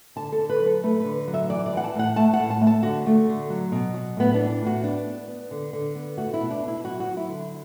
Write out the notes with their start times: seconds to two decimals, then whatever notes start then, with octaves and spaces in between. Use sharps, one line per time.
0.16 D3 A5
0.32 A4
0.38 D3
0.50 B4
0.60 F#3
0.66 A4
0.83 A3 B4
1.00 D3 B4
1.28 F#3
1.34 E5
1.50 E3 D5
1.66 D5
1.73 E3 F#5
1.84 A5
1.95 A2 F#5
2.16 A3 A5
2.33 F#5
2.39 A2
2.50 A5
2.61 A3
2.67 A5
2.83 D3 F#4
3.06 A3
3.28 D3
3.50 F#3
3.72 B2
3.94 F#3
4.17 A2 B3
4.34 D4
4.39 E3
4.50 D4
4.62 A2 F#4
4.84 B3 D4
5.06 B3
5.28 B3
5.51 D3
5.73 D3
5.95 B3
6.17 A3 F#4
6.34 E4
6.40 B2
6.51 D4
6.62 B2
6.68 E4
6.84 F#3 F#4
7.00 F#4
7.06 F#3
7.17 E4
7.28 D3